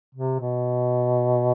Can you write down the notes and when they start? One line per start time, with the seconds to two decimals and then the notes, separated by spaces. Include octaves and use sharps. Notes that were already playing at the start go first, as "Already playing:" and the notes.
0.15 C3
0.40 B2